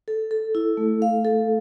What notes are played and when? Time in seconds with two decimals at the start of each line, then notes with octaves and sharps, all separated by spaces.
0.08 A4
0.31 A4
0.55 E4
0.77 A3
1.02 F5
1.25 A4